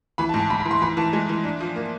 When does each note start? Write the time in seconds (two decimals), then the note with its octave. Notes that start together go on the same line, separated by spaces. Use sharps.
0.18 E3 B5
0.29 A5
0.34 G#2
0.40 A5
0.50 G#2 B5
0.60 B5
0.65 E3
0.71 C6
0.82 E3 B5
0.97 E3 A5
1.13 G#3
1.29 E3
1.44 D4
1.60 F3
1.76 A#3